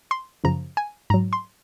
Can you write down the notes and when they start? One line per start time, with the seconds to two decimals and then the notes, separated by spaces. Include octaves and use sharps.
0.11 C6
0.44 F#2 C#3 F3 A#5
0.77 G#5
1.10 G#2 A#5
1.14 F#3
1.33 C6